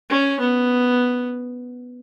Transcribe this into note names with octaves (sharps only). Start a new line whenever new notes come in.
C#4
B3